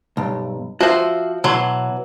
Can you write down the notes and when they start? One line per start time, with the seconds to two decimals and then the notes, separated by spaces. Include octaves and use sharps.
0.17 B1 G2
0.81 F3 F#4 C5 E5
1.44 B2 E3 F#3 C6